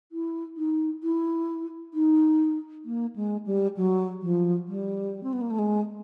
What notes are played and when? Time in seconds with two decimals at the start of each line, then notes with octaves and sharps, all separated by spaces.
0.12 E4
0.57 D#4
1.03 E4
1.94 D#4
2.85 A#3
3.16 G#3
3.46 G3
3.77 F#3
4.22 F3
4.68 G3
5.23 C4
5.33 B3
5.41 A#3
5.50 A3
5.59 G#3